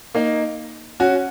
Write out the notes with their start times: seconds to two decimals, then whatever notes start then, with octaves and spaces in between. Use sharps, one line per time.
0.14 A#3 D#4
1.00 C#4 F#4